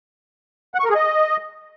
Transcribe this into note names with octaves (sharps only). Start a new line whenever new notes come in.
F#5
C#6
A#4
G#4
D#5